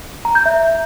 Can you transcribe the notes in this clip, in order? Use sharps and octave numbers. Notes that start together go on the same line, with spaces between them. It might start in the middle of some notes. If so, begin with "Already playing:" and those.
A#5
G6
E5